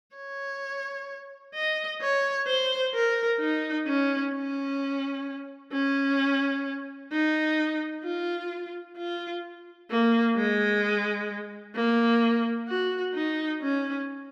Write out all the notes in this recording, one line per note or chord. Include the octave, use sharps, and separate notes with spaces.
C#5
D#5
C#5
C5
A#4
D#4
C#4
C#4
C#4
D#4
F4
F4
A#3
G#3
A#3
F#4
D#4
C#4